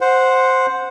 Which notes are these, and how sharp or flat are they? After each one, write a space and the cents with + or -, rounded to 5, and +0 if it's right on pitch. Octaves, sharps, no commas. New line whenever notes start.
C5 +0 F#5 -10